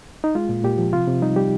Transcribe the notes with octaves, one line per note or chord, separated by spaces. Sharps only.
D#4
G#3 F4
A#2
A#2 G4
F3
C3 F4
C3
G3 D#4
G3 G4